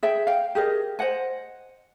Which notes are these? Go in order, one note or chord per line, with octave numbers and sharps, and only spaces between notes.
G#4 E5 G5
F5 G5
G4 G#4 A#4 D#5
C5 D#5 F#5 G#5